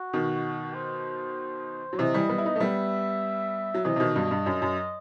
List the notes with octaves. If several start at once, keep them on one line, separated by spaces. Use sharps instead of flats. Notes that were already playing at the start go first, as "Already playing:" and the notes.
Already playing: F#4
B2 D#3
C5
F#3
C3 E3 D#5
E3 G3
G3 B3
E4
B3 D#4
A3
G3 B3 E5
F#3
C3 E3 D#5
C3
B2 D#3
G2 B2
G2
F#2
F#2